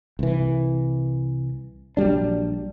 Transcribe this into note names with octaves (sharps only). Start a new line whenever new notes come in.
C2 E3
A#1 F#3 G3 D4